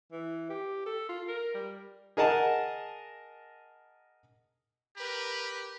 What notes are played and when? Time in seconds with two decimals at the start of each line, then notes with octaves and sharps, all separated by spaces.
0.12 E3
0.50 G4
0.86 A4
1.09 F4
1.28 A#4
1.55 G3
2.17 G#4 A#4 D#5 F#5 A5
4.97 G4 A#4 B4